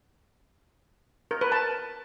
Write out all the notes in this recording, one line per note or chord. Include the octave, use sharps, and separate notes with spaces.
A#4
B4
A5